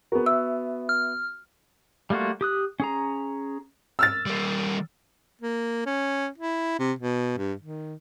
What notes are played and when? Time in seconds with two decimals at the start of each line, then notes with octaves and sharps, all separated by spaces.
0.12 B3 F#4 G#4 A#4
0.26 E5 E6
0.89 F6
2.10 G3 A3 A#3 F4 F#4
2.41 G4 D#6 F#6
2.80 C#4 G#4 A#5
3.99 E6 F6 A6
4.26 G3 A#3
5.42 A#3
5.86 C#4
6.38 E4
6.79 C3
6.99 B2
7.37 G2
7.62 D#3